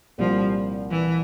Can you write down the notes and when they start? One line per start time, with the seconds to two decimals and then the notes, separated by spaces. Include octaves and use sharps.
0.18 C2 A#2 F3 G3
0.91 E3